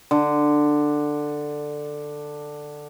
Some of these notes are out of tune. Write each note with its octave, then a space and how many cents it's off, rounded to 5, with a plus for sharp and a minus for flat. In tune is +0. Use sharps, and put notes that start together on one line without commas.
D3 +10